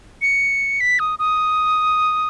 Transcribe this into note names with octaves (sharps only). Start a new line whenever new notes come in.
C#7
B6
D#6
D#6